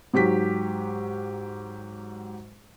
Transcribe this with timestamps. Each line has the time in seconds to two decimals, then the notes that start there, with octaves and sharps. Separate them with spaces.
0.14 G#2 F#3 G4 B6